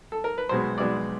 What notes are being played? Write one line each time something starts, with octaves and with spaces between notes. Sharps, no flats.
A4
A#4
B4
B1 B2 G#3 B3 C5
B1 B2 G#3 B3 D5